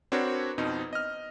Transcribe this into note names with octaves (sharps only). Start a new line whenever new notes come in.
C4 D4 F#4 A#4 B4 C#5
F2 B2 C4 D#4
D#5 F6